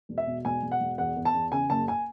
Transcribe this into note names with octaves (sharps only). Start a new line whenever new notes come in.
E1
E5
B2
E1 G#5
E1
F#5
E1
E2 F#5
E2
A5
E2
C#3 G#5
F#1 A5
G#5